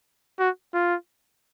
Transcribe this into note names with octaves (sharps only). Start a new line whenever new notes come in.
F#4
F4